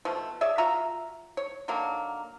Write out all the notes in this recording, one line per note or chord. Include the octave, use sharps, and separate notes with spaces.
B2 F3 A3
G#4 C#5 D5 E5
F4 F#4 E5 A#5
C#5
D3 D#3 F#3 A#3